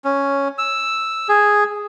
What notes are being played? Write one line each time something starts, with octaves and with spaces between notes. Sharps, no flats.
C#4
E6
G#4